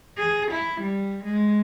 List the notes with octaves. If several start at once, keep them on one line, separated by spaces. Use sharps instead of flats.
G#4
E4
G3
G#3